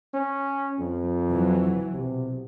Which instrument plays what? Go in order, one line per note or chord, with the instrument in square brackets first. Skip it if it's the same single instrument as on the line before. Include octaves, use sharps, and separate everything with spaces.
[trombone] C#4
[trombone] F2 [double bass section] F3
[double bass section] E3 F#3
[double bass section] B1 [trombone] C3